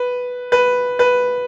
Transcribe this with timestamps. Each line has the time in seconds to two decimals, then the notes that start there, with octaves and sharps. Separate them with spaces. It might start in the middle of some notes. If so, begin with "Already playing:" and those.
Already playing: B4
0.52 B4
0.99 B4